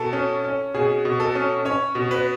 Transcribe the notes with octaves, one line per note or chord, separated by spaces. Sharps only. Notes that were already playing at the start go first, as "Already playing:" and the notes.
Already playing: B2 A4
C#4
C#4
B2 G#4
B2
A4
C#4
C#4 C#5
B2
B4